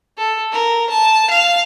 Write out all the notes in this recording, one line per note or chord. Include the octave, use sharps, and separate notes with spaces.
A4
A#4
A5
F5